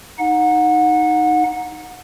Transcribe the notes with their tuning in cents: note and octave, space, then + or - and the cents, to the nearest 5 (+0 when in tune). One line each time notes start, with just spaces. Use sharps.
D#4 +0 F#5 -25